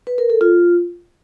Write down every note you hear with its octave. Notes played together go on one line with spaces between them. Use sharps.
B4
A#4
A4
F4